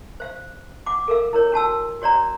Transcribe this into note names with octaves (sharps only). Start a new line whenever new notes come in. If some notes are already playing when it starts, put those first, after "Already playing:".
C5 F5
F#5 D6
A4 A#4 F5
E4 A#4 C#5
D4 F#4 A5 E6
F#4 C#5 D5 A#5